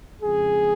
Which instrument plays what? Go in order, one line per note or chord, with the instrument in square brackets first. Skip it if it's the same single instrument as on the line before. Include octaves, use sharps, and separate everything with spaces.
[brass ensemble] F2 C#3 G#3 G#4